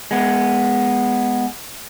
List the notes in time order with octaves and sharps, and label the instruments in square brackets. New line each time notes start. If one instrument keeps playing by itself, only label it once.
[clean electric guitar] G#3 B3